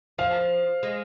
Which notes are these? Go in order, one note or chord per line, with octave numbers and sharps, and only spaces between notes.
F3 F5
G#3